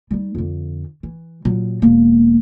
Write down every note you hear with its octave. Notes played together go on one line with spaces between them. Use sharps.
G3 D#4
F2 D3
E3
A#2 F#3
E1 A#3